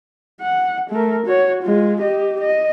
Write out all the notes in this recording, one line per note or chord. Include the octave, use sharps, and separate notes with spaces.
F#5
A3 A#4
F#4 C#5
G#3 F4
G4 D#5
D#5